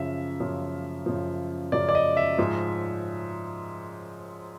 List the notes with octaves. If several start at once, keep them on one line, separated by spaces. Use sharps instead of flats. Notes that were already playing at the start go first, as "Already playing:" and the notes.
Already playing: F#2 C#3 F3 E5
F#2 C#3 F3
F#2 C#3 F3
F#2 C#3 F3 D5
D5
D#5
E5
G#2 F3 G#3